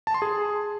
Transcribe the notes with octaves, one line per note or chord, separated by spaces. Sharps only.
A5
C6
G#4